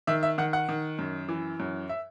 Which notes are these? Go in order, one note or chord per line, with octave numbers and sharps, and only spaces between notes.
D#3 E5
E5
D#3 F#5
F#5
D#3
F#2
E3
F#2
E5